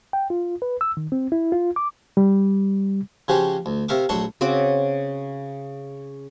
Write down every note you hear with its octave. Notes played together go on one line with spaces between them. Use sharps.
G5
F4
B4
E6
D#3
C4
E4
F4
D6
G3
C#3 F3 C#4 F#4 G4 C5
D2
C3 A#4 E5 F5 C#6 D6
A#1 F#3 A3 D4 C6 C#6
C#3 C4 F#4 D6